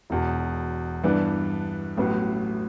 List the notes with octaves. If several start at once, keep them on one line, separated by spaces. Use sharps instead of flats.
E1 E2 B2
G2 E3 B3 D4
A1 A2 F#3 B3